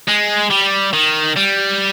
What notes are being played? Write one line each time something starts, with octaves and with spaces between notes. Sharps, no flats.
G#3
G3
D#3
G3